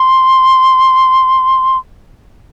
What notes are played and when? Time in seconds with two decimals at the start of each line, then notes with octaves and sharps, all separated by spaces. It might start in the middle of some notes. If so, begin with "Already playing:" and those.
Already playing: C6